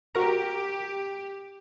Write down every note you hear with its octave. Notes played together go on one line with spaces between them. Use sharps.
F#4 G4 A#4 A#5